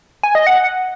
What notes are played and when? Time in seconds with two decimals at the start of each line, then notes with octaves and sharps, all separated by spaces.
0.23 G#5
0.35 D#5
0.47 F#5